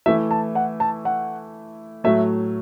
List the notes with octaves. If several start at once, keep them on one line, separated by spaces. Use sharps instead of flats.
E3 A3 E4 E5
A5
F#5
A5
F#5
A2 F#3 A3 E5